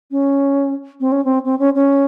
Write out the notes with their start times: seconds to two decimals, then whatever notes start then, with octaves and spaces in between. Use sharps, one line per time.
0.11 C#4
1.00 C4
1.12 C#4
1.24 C4
1.45 C4
1.59 C#4
1.75 C#4